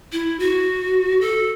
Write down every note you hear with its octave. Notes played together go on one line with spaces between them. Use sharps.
E4
F#4
A4